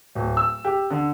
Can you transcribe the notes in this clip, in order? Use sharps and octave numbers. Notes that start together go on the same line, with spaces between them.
D1
E6
G4
D3